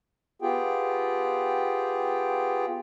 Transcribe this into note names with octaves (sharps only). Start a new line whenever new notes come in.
B3 F4 G4 G#4 G5